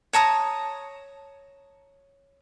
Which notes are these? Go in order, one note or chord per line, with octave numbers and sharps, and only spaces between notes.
C#5 A5 A#5 D#6